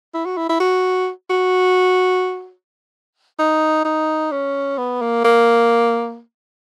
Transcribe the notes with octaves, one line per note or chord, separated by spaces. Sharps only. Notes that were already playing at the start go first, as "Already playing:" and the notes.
E4
F#4
E4
E4
F#4
F#4
D#4
D#4
C#4
B3
A#3
A#3